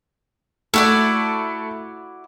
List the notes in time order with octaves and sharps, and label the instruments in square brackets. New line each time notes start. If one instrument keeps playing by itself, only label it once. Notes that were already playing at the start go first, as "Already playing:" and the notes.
[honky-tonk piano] A3 [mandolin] E4 F#4 D5